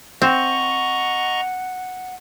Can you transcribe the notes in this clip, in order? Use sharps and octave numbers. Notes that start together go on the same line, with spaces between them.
C4 D#5 F#5 A#5 C#6